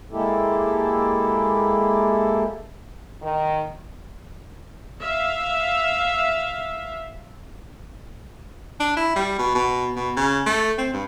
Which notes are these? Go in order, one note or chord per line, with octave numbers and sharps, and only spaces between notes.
G#3 A#3 E4 G4 A4
D#3
E5 F5
D4
E4
G3
B2
B2
B2
C#3
A3
C4
G2